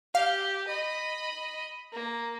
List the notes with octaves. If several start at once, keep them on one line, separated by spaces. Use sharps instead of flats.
G4 F5
D#5 B5
A#3